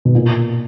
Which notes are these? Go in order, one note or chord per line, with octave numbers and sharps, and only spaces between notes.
B2
A#2